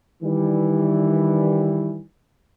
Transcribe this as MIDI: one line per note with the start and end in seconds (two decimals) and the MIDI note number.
0.23 2.00 51
0.23 2.00 52
0.23 2.00 55